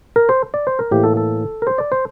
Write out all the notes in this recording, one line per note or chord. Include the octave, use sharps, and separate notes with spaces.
A#4
C5
D5
C5
A#4
A2 E3 A#3 G4
A4
A4
A#4
C5
D5
C5